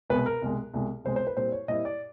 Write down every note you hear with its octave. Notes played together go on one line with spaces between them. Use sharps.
C2 B2 G#3 B4
A#4
C2 B2 G#3
C2 B2 G#3
C2 B2 G#3 C5
C5
B4
A#2 G3 C4 E4 C5
C#5
A#2 G3 C4 E4 D#5
D5